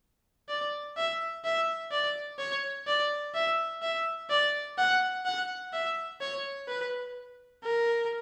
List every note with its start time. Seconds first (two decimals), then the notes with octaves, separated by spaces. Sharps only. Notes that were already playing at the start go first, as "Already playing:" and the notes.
0.49 D5
0.97 E5
1.45 E5
1.92 D5
2.39 C#5
2.87 D5
3.35 E5
3.82 E5
4.30 D5
4.78 F#5
5.26 F#5
5.73 E5
6.21 C#5
6.68 B4
7.63 A#4